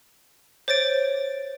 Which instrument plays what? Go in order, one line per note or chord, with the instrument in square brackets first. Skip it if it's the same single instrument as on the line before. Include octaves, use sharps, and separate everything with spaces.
[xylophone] C5 C#5 A6 D7